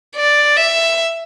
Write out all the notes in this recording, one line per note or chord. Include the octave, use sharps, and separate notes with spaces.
D5
E5